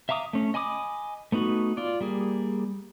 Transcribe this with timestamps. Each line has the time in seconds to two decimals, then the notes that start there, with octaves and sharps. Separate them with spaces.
0.09 E5 F5 A#5 D6 D#6
0.33 A3 C#4
0.54 D#5 G#5 B5 D6 D#6
1.32 A3 B3 D#4 F#4
1.77 F4 D5
2.01 G3 A#3 G#4